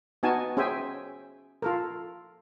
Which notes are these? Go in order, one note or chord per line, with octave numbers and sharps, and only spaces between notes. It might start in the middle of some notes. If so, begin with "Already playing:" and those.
B3 D#4 F#4 G#5 A5
C#4 G#4 C5 E5 G5 G#5
F4 A4 A#4